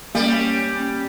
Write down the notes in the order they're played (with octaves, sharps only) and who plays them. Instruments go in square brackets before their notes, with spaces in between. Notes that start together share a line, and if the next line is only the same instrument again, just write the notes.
[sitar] G3 [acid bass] A#3 [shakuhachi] C#4